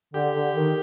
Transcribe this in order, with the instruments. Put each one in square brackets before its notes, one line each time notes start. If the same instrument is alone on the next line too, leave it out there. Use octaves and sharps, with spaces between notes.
[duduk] D3 [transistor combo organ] G4
[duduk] D3
D#3